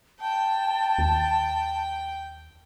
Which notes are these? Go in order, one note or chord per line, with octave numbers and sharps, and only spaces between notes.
G5 A5
D#2